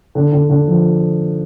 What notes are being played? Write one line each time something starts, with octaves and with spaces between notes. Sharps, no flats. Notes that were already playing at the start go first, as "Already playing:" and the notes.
D3
D3
D3
F3